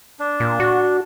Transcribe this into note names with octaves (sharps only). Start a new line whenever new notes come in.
D4
A#2
F#4